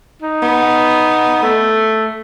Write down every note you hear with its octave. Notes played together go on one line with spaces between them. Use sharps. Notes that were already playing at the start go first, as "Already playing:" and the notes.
D#4
B3
A3